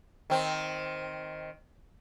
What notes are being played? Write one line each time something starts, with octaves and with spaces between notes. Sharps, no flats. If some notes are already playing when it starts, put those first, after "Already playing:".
D#3 C4